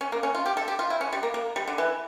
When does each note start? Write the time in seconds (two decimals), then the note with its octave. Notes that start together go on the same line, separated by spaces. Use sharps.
0.01 C#4
0.12 A#3
0.23 C#4
0.35 F4
0.46 G4
0.57 A4
0.68 G4
0.79 F4
0.90 E4
1.01 C#4
1.12 G3
1.23 A#3
1.34 A#3
1.56 G3
1.68 D3
1.78 E3